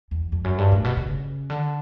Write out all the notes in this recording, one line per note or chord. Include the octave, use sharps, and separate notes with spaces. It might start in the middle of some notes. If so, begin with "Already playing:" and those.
E2
F2
F#2
G2
A2
B2
C#3
D3